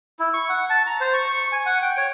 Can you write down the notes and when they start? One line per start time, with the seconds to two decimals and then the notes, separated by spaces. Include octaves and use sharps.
0.19 E4
0.34 C#6
0.49 F#5
0.70 A5
0.87 A#5
1.01 C5
1.14 C#6
1.34 C#6
1.52 G#5
1.66 F#5
1.82 G5
1.97 C#5